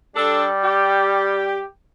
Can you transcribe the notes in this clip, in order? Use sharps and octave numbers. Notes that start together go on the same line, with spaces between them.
G3 D4 A4
G4